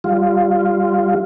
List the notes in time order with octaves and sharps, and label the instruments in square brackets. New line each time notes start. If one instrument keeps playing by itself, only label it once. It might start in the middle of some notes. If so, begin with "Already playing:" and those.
[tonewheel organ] G3 F4